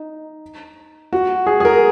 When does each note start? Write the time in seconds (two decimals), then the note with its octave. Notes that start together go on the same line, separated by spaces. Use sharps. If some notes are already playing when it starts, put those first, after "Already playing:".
Already playing: D#4
1.13 F#4
1.47 G#4
1.60 G#4
1.65 A#4